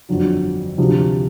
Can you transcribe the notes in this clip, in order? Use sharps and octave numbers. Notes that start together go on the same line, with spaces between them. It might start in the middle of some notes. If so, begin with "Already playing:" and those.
G1 F2 D3 F#3
D2 C3 F3